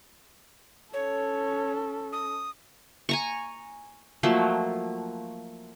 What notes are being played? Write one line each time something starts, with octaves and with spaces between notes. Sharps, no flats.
C#4 A4 C#5
D#6
G#5 A#5 C#6
F3 F#3 A3 A#3